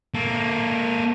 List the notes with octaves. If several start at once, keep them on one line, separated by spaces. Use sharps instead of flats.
A#3 A4